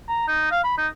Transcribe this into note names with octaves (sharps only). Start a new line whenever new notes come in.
A#5
D#4
F5
B5
D#4